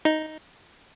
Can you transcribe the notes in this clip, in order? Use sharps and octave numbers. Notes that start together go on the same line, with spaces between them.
D#4 D#5